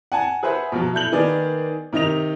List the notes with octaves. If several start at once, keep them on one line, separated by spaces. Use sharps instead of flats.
F#5 G#5 A5
G#4 B4 C5 E5 F#5
B2 F3 F#3
E4 A4 G6 F#7
D#3 A#3 B3 G#4 D5
C3 D#3 D#4 D#5 F7